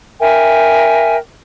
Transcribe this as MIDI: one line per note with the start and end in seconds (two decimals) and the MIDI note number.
0.19 1.17 70
0.19 1.17 76
0.19 1.17 79
0.19 1.17 80